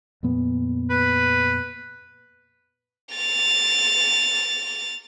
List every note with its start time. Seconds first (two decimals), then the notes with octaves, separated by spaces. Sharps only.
0.23 F2 A#2 B3
0.90 B4
3.15 A6 F7